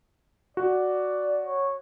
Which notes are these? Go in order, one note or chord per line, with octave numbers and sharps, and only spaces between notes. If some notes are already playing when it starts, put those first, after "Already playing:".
F#4 D5
C#5